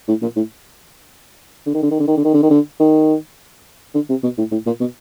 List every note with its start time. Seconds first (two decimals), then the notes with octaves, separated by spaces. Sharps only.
0.08 A2
0.22 A#2
0.36 A2
1.66 D3
1.74 D#3
1.82 D3
1.91 D#3
1.99 D3
2.07 D#3
2.17 D3
2.24 D#3
2.33 D3
2.42 D#3
2.50 D3
2.80 D#3
3.94 D3
4.09 C3
4.23 B2
4.38 A2
4.51 A2
4.66 A#2
4.80 B2